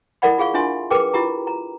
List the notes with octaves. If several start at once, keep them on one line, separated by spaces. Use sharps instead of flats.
E4 A4 A#4 D5 F#5 B5
F4 G#4 F5 C#6
D4 F4 E5 G#5 C6
G#4 A#4 B4 G5 D6
E4 F4 G4 A#5
A#5